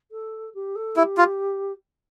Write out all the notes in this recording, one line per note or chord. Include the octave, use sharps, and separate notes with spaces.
A4
G4
A4
E4 G4
F4